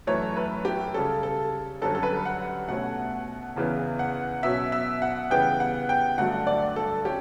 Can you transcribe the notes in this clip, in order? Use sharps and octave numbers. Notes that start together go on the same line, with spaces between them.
F#2 E3 A3 C#5
B4
G4
C#3 G3 C#4 A4
A4
F#2 D3 G3 C#4 A4
A4
B4
F#5
B2 A3 C#4 F#5
E2 C#3 E3 B3
F#5
B2 F#3 C#4 E5
E5
F#5
C#3 E3 G3 B3 G5
F#5
G5
G2 D3 F#3 A3 F#5
D5
A4
C#4 G4